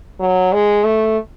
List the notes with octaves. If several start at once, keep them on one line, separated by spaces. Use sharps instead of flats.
F#3
G#3
A3